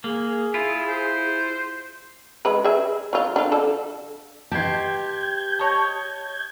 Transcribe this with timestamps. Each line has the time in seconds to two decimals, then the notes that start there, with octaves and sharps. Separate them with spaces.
0.04 A#3 G#4
0.54 E4 F4
0.88 C5
2.45 G#3 B4
2.64 G#4 E5
3.13 F#3 F4
3.36 D4 F4
3.52 D3 A4
4.52 F#4 G4 B4 D#5 A5 C6 G6 G#6
5.59 C#5 D#5 A5